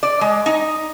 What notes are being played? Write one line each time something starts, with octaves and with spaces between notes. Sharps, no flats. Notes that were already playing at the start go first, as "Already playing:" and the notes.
D5
G#3
D#4